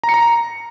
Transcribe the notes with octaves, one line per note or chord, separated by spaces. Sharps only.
A#5
C#7
A#5